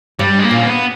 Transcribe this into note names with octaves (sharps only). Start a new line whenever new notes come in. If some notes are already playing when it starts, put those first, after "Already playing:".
G2 G3
G#3
A#3
A#2 C#4
B3